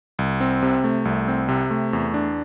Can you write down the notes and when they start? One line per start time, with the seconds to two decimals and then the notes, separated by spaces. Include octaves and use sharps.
0.19 C2
0.41 C4
0.63 C3
0.84 A3
1.05 C2
1.28 C4
1.48 C3
1.71 A3
1.93 E2
2.14 D4